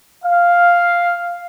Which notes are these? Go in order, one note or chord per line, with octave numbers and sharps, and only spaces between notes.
F5